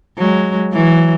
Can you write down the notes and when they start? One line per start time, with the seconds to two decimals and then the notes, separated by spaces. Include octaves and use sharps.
0.18 F#3 G#3
0.73 E3 F#3